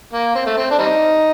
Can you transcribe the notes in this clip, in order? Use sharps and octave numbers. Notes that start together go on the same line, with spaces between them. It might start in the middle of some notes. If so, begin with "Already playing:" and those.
A#3
C4
A3
C4
D4
G3 C4 D#4